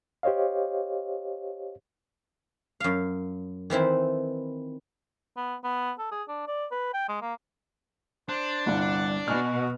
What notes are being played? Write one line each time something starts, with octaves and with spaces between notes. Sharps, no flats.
G4 C5 C#5 D#5 F5
F#2 F5
D#3 E3 C4 E4
B3
B3
A4
G#4
D4
D5
B4
G5
G#3
A#3
D4 C5
G1 C2 F#5
B2 F#4 G#5 F6